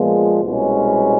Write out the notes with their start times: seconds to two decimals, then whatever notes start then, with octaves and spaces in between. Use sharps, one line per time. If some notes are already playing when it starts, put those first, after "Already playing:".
Already playing: A#2 F3 G#3 B3
0.43 C2 B2 G#3 C#4